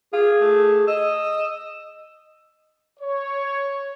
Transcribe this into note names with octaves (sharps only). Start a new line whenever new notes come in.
F4 G#4
A3
D#5 E6
C#5